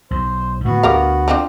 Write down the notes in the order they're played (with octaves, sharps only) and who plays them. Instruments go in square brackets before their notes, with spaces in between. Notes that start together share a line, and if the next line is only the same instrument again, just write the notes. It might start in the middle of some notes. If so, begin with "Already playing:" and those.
[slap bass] B1 [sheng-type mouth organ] C5
[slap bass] A2 D3 A3 [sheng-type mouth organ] B3 F#4
[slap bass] D2 [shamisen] G4 A#4 F5
[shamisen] F3 C4 D4